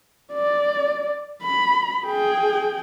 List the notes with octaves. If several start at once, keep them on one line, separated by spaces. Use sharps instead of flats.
D5
B5
G#4 G5